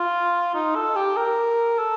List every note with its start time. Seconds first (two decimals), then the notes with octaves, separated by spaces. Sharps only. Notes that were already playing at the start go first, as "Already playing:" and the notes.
Already playing: F4
0.54 D#4
0.75 A4
0.96 G4
1.17 A#4
1.79 A4